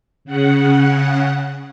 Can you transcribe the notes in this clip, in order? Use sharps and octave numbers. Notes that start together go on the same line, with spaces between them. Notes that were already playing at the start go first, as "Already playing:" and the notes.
C#3 F#5